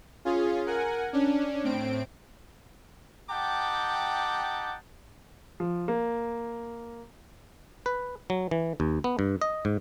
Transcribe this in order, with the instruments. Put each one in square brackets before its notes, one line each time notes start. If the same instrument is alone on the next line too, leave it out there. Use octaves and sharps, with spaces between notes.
[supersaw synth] C#4 F4 G#4
A#4 F#5 G#5
C#4 D4
A2 C4 D7
[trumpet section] D#4 G4 F#5 G5 A5 D6
[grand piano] F3
A#3
[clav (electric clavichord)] B4
F#3
E3
D#2
B3
G2
D#5
G#2